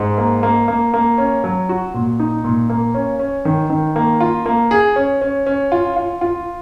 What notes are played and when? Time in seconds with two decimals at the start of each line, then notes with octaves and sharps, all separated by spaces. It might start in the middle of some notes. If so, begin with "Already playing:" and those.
Already playing: G#2
0.18 A#3
0.43 A#3
0.68 A#3
0.94 A#3
1.18 C#4
1.44 F#3
1.69 F#4
1.94 A#2
2.20 D#4
2.44 A#2
2.70 A#3
2.94 C#4
3.19 C#4
3.45 D#3
3.70 D#3
3.96 A#3
4.20 F4
4.46 A#3
4.71 G#4
4.96 C#4
5.22 C#4
5.46 C#4
5.72 F4
5.97 F4
6.21 F4